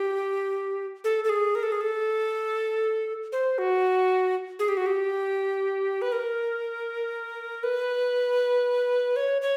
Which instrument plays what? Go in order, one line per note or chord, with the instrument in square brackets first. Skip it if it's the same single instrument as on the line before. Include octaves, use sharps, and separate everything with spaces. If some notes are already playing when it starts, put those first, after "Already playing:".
Already playing: [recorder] G4
A4
A4
G#4
A#4
A4
G#4
A4
C5
F#4
G#4
G4
F#4
G4
B4
A#4
B4
C#5
C#5